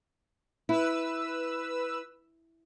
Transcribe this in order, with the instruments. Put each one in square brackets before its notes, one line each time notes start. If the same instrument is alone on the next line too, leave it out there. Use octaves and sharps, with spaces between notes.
[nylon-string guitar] E4 [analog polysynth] B4 E6